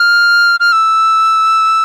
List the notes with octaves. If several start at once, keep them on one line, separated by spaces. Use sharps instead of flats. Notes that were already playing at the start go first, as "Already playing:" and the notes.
Already playing: F6
F6
E6